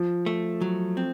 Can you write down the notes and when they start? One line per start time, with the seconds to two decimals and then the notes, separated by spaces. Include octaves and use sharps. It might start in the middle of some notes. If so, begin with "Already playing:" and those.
Already playing: F3
0.26 A3
0.61 F#3
0.97 C4